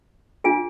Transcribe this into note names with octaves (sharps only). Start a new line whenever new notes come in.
D4 F4 G#4 G#5